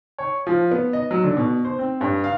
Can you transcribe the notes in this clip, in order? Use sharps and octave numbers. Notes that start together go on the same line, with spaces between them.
C#5
F3
B3
D#5
F#3
D3
B2
C5
C4
G2
F5